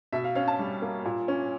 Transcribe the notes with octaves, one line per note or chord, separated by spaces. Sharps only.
B2 E5
F5
C#4 F5
A5
G3
A#3
A#2
C#4